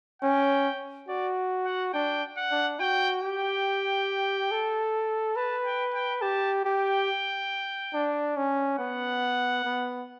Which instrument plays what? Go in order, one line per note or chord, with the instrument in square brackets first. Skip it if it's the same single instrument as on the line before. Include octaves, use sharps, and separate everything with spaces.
[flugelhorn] C#4 [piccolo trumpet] G5
[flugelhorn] F#4 [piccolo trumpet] D5
[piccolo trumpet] F#5
[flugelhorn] D4 [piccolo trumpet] G5
[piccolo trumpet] F#5
[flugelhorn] D4
[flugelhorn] F#4 [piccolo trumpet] G5
[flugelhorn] G4 [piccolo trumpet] G5
[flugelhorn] A4
[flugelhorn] B4 [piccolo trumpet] A5
[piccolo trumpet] G5
G5
[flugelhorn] G4 [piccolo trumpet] A5
[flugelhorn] G4 [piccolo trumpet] G5
[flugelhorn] D4
C#4
[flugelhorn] B3 [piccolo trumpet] F#5
[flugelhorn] B3